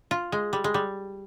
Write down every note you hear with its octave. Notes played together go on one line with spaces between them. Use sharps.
F4
G#3
G3
G#3
G3